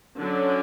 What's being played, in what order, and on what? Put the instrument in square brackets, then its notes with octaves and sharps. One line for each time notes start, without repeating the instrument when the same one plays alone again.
[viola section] D3 F#3 C#4